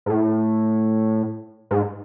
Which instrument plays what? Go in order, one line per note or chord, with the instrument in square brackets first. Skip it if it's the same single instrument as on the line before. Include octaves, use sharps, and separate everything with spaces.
[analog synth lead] G#2
A2
G#2